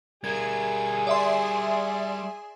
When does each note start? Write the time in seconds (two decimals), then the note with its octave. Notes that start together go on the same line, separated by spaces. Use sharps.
0.24 G3 G#4 A#4 G#6
1.07 D5 E5 C6